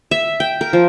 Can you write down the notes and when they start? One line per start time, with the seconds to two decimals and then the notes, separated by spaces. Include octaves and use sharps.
0.11 E5
0.40 G5
0.61 A#4
0.73 F3